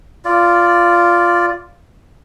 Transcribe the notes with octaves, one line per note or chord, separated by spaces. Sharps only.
F4 D5